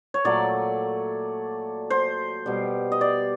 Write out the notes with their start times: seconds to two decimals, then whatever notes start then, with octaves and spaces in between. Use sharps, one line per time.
0.14 C#5
0.25 A#2 F#3 A3 D5
1.90 C5
2.46 B2 G3
2.92 D#5
3.01 D5